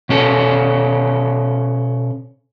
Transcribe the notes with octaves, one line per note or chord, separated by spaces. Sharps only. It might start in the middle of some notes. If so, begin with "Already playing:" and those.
B2 C#4 A4